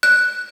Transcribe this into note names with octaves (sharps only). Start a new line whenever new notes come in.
F#6